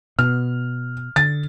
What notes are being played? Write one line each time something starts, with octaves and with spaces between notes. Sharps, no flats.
B2 F6
D3 A6